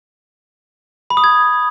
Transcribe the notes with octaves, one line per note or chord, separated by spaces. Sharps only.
B5
D#6
G#6